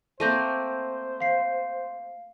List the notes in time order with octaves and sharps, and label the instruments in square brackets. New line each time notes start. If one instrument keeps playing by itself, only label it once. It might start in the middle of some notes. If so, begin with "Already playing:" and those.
[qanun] A3 A#3 C4 [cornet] C5 [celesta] G6 A#6 D#7
[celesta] F5 C7